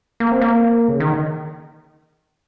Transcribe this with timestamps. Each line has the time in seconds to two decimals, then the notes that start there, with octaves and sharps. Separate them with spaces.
0.20 A#3
0.32 C4
0.42 A#3
0.88 C#3
1.00 D#3